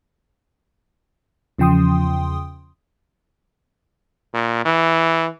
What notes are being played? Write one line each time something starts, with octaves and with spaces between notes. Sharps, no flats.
E2 C#3 F3 G5 C6 D#6
A#2
E3